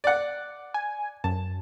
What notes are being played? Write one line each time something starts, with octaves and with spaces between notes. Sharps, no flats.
D5 F#5
G#5
F#2 A5